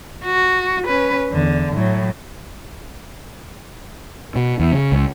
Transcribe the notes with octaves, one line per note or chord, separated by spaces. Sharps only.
F#4
C#4 B4
E2 D3
A2 F#3
B2
E2
C#3
C#2